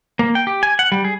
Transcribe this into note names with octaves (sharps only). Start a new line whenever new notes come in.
A#3
G5
G4
G#5
F#5
G3
G#4